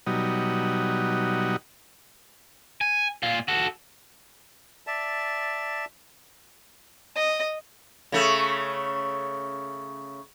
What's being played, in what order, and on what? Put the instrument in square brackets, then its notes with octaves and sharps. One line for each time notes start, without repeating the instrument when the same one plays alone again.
[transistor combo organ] B2 F#3 G3 D#4
[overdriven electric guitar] G#5
A#2 F4
F#4 A4
[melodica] D5 E5 A5
[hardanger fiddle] D#5
[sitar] C#3 A3